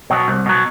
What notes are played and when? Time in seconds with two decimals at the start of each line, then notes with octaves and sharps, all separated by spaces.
0.10 B2 F#3
0.28 C2
0.46 B2 F#3